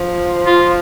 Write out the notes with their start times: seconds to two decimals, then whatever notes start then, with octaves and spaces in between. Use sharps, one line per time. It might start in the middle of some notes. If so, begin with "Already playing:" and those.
Already playing: F3
0.47 F4